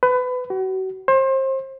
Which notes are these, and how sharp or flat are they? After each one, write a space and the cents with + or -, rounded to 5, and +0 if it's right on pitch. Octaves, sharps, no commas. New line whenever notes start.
B4 +25
F#4 +35
C5 +30